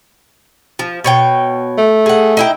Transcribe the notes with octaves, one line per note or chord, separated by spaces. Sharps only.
F3
B2 C#5 G5
A3
G#4 F#5
D#4 E4 G5